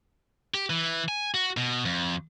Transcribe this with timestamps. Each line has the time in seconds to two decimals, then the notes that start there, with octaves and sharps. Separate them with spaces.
0.54 G4
0.70 E3
1.08 G#5
1.34 F#4
1.57 B2
1.85 F2